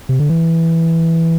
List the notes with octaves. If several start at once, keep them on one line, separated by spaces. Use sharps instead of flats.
C3
D3
E3